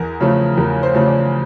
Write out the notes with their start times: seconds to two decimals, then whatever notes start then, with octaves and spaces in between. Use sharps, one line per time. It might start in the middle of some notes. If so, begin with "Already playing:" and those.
Already playing: E2 A#4
0.21 C#3 F3 A3
0.58 E2 A#4
0.83 C5
0.94 C#3 F3 A3
1.07 D5